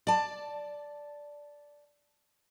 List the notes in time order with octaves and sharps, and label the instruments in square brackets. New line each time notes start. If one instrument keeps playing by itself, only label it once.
[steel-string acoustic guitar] D5 A5